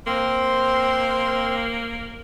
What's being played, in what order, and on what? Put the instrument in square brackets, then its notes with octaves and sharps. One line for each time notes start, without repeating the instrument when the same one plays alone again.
[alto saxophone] A#3 [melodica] C4 C6 [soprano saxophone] C5